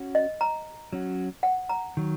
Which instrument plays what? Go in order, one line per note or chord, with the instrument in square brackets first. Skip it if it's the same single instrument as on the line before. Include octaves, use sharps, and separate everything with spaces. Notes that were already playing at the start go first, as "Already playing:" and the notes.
Already playing: [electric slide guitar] C#4 F#4
[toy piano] D#5
A#5
[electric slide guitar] F#3 C#4 F#4
[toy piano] F#5
A#5
[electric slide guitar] D#3 F#3